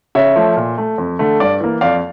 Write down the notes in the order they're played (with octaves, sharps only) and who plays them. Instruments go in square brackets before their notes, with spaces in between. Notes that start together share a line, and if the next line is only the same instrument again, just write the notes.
[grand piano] C#3 C#5 E5
F3 A3
A#2
A3
F2
D3 A3
G2 D5 F5
E3 A#3
F2 D5 F5